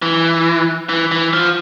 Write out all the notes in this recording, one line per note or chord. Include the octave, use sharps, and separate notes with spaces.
E3
E3
E3
F3